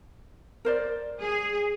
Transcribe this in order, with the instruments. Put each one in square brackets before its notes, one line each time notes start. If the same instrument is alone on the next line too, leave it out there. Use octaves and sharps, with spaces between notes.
[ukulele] A#4 C5 D5
[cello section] G#4